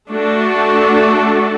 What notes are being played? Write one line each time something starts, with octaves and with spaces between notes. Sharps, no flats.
A3 D4 F#4 A4